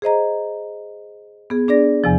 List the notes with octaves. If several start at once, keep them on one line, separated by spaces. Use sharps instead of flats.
G#4 C5 D#5 A#5
B3 G#4
D4 G#4 D5 A#6
E2 C3 F3